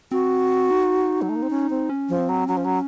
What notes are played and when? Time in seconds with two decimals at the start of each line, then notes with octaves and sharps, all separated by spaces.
0.11 C4 F#4
0.71 D#4
1.22 F#3
1.29 A3
1.36 A#3
1.43 C4
1.50 C#4
1.70 C4
1.89 C#4
2.09 F3
2.19 C4
2.29 F#3
2.48 F#3 C#4
2.57 F3
2.65 F#3